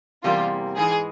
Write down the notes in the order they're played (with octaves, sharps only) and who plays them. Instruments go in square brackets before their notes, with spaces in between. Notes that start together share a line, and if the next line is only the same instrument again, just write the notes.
[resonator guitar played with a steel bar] E2 C3 G3 A#3 [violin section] F4
[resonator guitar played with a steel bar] G#2 E3 G#3 [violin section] G#4